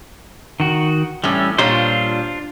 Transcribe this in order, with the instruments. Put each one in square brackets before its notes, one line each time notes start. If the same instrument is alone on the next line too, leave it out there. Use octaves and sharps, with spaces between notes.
[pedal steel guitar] D#3 F#4
[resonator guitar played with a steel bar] A2 E3 [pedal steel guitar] G3 C#4
[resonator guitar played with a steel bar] A#2 G3 C#5 [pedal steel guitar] D4 F4 C5